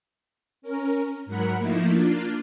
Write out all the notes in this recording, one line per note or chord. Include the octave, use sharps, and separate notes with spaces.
C#4 A#4
G#2 F#3 A#4 F#5 B5
F3 A3 A#3 D#4 E4
A#3 D4 F4